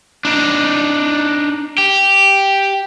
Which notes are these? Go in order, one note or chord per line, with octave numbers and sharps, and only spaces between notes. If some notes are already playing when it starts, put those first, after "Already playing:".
D4 D#4
G4